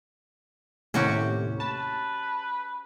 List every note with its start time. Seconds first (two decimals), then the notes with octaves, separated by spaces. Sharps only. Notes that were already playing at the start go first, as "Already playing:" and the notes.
0.94 D#2 A2 C3 C#4 F#4 G4
1.60 B4 A5